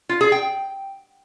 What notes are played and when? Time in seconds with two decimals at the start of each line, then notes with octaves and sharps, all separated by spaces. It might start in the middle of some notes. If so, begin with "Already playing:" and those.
0.09 F4
0.21 G#4
0.32 G5